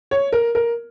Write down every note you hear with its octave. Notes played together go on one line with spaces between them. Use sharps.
C#5
A#4
A#4